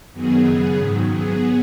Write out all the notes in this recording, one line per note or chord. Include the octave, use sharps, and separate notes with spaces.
F#2 D#3 F#3 B3 G#4
C#3 B3 G#4
G#2 D#3 F#3
F#3 B3 G#4